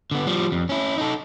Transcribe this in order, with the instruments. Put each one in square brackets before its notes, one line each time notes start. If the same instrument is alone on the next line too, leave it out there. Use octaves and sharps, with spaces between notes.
[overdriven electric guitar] D3 B3
F3 G3
F2
C#4 E4
D#4 A4